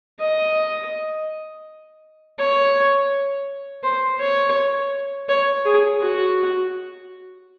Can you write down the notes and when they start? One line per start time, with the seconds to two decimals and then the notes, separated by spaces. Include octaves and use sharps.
0.20 D#5
2.39 C#5
3.83 C5
4.20 C#5
5.29 C#5
5.65 G#4
6.01 F#4